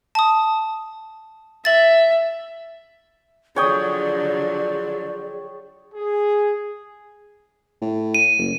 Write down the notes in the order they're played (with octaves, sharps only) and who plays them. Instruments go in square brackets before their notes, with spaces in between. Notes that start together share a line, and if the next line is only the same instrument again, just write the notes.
[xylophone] A5 D#6
[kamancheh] E5 [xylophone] A6 F#7
[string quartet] D3 F3 F#3 [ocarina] G#4 [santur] C#5 G5 D#6 [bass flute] D5
[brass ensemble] G#4
[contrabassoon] A2
[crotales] D#7
[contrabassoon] F#1